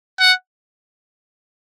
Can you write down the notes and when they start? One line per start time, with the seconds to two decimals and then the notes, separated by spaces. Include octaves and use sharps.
0.19 F#5